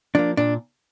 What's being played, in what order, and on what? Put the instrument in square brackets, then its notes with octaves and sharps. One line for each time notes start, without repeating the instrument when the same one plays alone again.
[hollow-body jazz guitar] F3 A#3 D4
A#2 D4